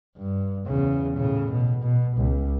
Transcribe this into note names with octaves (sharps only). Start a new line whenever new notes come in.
G2
E2 C#3
A2 C#3
B2
B2
C#2